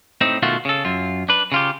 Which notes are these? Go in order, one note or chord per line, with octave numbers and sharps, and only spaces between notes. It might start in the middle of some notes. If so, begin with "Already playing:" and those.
A2 C4 D#4
B2 D#3 A3 F4 F#4
C#3 A4
F#2 F4
D4 B4
C#3 F4 G4